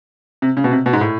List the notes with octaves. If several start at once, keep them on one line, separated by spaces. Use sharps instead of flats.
C3
C#3
B2
C3
B2
G#2
A2